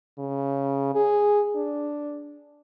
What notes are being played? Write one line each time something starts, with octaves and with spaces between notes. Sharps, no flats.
C#3
G#4
D4